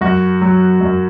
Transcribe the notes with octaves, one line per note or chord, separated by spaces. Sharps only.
F#2 F#4
F#3
F#2